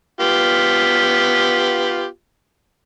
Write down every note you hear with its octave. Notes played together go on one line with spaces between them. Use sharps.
B3 F4 G4